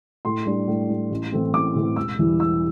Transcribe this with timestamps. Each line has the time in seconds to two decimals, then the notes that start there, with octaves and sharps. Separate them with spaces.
0.25 A2 C6
0.46 G3 D4
0.68 A2
0.89 G3 D4
1.11 A1
1.32 A2 E3 A3 C4
1.54 A1 D6
1.75 A2 E3 A3 C4
1.96 E1 E6
2.19 E2 E3 G3 E4
2.40 E1 E6